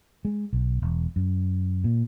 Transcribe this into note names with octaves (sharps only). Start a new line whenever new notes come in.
G#3
B1
E1
F#2
A#2